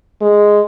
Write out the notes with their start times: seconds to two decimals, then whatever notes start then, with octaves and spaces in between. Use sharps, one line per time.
0.22 G#3